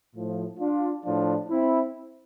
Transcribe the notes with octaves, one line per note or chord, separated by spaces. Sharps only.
A2 F3
D4 F4
A2 F3 D4 F4
C4 E4